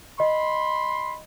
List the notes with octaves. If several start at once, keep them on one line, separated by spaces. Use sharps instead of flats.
D#5 B5 C6